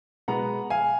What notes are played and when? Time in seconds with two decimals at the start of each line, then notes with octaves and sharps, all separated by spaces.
0.28 B2 G#3 B3 F#5 A#5
0.70 F5 G#5